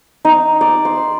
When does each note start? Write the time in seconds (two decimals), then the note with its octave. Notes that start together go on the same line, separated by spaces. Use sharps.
0.25 D#4
0.61 D5
0.85 C6